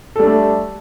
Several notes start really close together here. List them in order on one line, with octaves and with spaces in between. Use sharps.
A4 G3 D4 A3